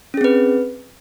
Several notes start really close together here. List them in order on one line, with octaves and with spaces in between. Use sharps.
C#4 G#4 C4 B4